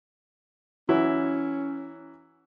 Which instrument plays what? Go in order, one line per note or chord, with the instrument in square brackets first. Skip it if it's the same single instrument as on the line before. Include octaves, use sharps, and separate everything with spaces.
[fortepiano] E3 F#3 E4 [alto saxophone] C#4